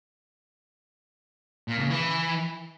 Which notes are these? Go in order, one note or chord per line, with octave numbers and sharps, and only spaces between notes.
A#2
C#3
E3